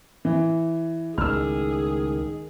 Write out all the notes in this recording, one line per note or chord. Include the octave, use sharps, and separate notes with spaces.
E3
C#2 A2 D#3 G#4 E6 F6